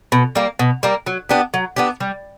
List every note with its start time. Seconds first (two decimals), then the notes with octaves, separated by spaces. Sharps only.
0.12 B2
0.35 G3 A#3
0.59 B2
0.83 G3 A#3
1.06 F#3
1.29 B3 D4 G4
1.54 F#3
1.76 B3 D4 G4
2.00 G3